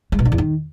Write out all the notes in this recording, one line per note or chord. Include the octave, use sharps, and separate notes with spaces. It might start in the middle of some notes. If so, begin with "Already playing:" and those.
G#3
B2
D3
E2
D#3